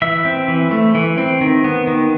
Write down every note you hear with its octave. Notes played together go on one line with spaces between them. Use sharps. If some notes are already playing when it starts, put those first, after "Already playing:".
E3 E5
C4
E3
A3
E3
C4
D#3
B3
D#3